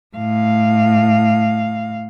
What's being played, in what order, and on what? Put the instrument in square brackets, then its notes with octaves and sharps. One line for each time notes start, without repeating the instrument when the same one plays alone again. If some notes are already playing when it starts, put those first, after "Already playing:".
[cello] A2 F5